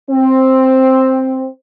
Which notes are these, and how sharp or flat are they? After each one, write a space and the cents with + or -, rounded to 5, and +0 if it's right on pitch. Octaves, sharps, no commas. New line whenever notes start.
C4 +5